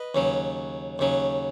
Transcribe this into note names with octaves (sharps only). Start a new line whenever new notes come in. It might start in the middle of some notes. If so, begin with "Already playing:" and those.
Already playing: B4 D#5
D#2 C#3 F#3
D#2 C#3 F#3